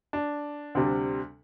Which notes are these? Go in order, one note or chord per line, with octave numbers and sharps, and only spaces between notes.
D4
D2 C3 G3